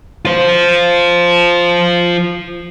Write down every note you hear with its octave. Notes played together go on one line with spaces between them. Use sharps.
F4 C5